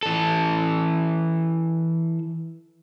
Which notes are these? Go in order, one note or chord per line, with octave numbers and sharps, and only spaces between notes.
E3 A4